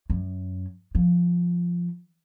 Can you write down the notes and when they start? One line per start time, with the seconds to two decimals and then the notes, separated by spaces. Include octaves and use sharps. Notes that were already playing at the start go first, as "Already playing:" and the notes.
0.10 F#2
0.95 F3